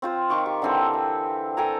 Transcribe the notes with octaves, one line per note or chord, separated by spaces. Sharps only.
C4 F4 C5
D#3 F4 C#6 D6
G4
D3 E3 C4 A4
E5
A4 G5 G#5 A#5